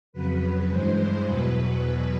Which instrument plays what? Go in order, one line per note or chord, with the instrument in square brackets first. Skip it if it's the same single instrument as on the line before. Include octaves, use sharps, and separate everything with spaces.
[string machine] F2 C#3 F#3 B4
G2 E3 G#3 C5
C5
E2 B2 F#3 B4